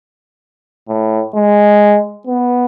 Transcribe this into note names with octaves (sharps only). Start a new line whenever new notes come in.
A2
G#3
B3